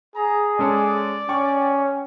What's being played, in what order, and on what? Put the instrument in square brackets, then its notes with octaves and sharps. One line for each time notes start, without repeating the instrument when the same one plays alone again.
[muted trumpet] G#4 [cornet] A#5
[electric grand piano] G#3 C#4 A4 [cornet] D5
[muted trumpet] C#4 [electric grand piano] G5 C#6